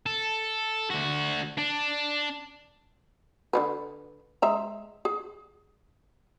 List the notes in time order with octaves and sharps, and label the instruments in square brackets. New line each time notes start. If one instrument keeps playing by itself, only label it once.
[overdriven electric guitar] A4
D2 F#4
D4
[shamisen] D3 G3 B4
G#3 E5 A#5
G#4